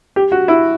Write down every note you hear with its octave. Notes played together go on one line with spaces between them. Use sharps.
G4
F#4
E4